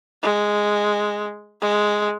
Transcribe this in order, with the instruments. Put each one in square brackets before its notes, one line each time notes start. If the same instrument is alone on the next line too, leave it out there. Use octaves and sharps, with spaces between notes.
[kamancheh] G#3
G#3